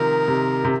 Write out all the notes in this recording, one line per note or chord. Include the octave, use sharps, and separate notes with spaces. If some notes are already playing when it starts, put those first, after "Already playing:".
Already playing: C3 D#3 F3 D#4 A#4
C3
C3